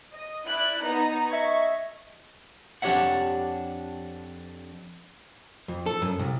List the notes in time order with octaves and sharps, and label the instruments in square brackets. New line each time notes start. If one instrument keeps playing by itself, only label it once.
[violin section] D#5
E4 D5 F#6
B3 D#4 A#5
[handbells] D#5 E5 G#6 [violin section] C#6
[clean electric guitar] F2 D4 G4 C#5 E5 F#5
[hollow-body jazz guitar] F2
A4
F#2
C2